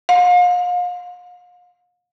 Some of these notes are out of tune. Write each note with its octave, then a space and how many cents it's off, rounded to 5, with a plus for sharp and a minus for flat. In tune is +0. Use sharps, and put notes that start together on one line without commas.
F5 +40